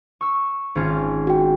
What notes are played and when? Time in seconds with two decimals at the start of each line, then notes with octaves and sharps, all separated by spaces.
0.21 C#6 E6
0.75 G#1 C#4 F4
1.27 F#4 G5